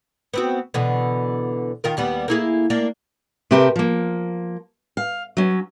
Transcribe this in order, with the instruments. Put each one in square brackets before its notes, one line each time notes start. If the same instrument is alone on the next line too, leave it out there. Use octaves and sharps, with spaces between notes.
[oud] B3 C4 F#4
B2 D3 E3
D#3 F4 A#4
D#2 G3 B3
A#3 E4 G#4
A#3 D4
[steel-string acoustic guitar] C3 A3 C4 G4 A#4 B4
F3 A#3
F5
F#3 C#4